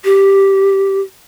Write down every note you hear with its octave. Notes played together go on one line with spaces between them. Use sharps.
G4